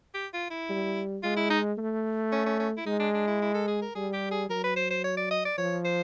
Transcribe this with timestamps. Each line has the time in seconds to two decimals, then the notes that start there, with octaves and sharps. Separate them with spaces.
0.14 G4
0.34 F4
0.50 E4
0.69 G3
1.23 G#3 F4
1.37 E4
1.50 D#4
1.78 A3
2.32 C#4
2.46 C#4
2.59 C#4
2.77 E4
2.86 G#3 D#4
3.00 D4
3.14 D4
3.27 E4
3.42 E4
3.54 A4
3.68 G#4
3.82 A#4
3.95 G3 G#4
4.13 G4
4.31 G#4
4.49 F#3 A#4
4.64 B4
4.76 C5
4.90 C5
5.04 C#5
5.17 D5
5.31 D#5
5.45 D5
5.58 F3 C#5
5.85 C5